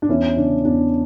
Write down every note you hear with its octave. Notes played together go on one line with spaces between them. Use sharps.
D4
E2 C#4 E4
C#3 D4
E2 D4